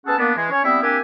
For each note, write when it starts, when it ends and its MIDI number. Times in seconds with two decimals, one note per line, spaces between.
0.06 0.17 59
0.06 0.17 61
0.06 0.17 68
0.06 0.17 69
0.06 0.17 78
0.06 0.17 81
0.18 0.32 58
0.18 0.32 59
0.18 0.32 62
0.36 0.48 52
0.36 0.48 56
0.50 0.63 61
0.50 0.63 73
0.64 0.80 55
0.64 0.80 59
0.64 0.80 60
0.64 0.80 64
0.64 0.80 76
0.83 0.99 58
0.83 0.99 60
0.83 0.99 62
0.83 0.99 67
0.83 0.99 76
0.83 0.99 80